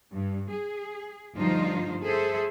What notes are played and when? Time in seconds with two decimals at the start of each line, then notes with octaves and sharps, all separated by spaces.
0.13 G2
0.52 G#4
1.36 D2 G2 F3 D#4 F4 C5
2.04 G#4 A4 C5 E5